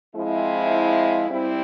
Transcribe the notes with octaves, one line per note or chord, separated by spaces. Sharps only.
F3 G#3 C4 E4
G3 C4 E4